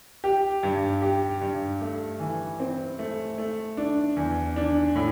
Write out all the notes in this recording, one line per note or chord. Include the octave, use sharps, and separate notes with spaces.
G4
G2
G4
G2
A3
E3
C4
A3
A3
D4
E2
D4
A2